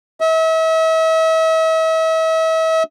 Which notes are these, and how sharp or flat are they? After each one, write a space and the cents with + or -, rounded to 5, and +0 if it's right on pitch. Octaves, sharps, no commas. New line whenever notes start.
E5 -40